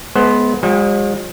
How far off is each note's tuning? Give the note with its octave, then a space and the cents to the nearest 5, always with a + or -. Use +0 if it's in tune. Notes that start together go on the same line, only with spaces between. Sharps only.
G#3 +35 B3 +0 C5 +5
F3 +45 G#3 -40 G5 +0